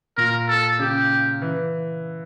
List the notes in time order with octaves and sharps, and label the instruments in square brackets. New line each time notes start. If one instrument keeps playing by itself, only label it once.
[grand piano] A#2 [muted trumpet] A#4
[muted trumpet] A4
[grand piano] C#3 [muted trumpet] G4
[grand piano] E3